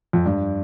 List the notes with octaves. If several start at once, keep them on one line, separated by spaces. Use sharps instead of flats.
F2
G2